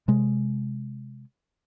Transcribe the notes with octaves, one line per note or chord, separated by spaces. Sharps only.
C3 G#3